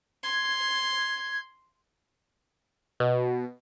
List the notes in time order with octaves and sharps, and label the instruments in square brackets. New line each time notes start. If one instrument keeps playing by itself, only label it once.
[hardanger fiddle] C6 [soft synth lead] G#6
[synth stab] B2